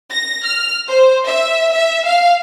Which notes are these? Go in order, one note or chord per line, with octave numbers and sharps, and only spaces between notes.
A#6
F6
C5
E5
E5
F5